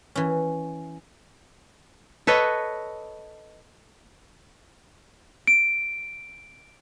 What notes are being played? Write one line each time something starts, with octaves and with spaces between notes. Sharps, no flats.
E3 C#4
A4 B4 C#5 D#5
D7